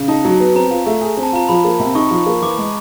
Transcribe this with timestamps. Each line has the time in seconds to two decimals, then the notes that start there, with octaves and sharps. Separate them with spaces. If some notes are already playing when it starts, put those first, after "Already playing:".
Already playing: C#3
0.08 D#4 A5
0.25 F#3
0.40 B3
0.55 C4 A#5
0.71 F4
0.86 A3
1.01 G#4
1.17 C4
1.23 A5
1.33 F4 A#5
1.48 F3 B5
1.65 A#3
1.80 C3
1.95 D#4 C#6
2.11 F3
2.26 A#3
2.42 E3 D6
2.58 G#3